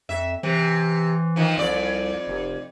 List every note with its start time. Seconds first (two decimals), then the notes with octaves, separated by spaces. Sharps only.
0.09 F2 E5
0.43 C3 E3
1.36 D#3 F3
1.57 C2 F2 D5
2.27 F1